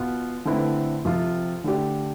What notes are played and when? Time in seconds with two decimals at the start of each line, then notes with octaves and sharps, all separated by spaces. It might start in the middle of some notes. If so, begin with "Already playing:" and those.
Already playing: B2 B3 F4
0.45 D3 A3 C4 E4 B4
1.05 C3 F3 C4 F4 A4
1.64 D3 A3 D4 G4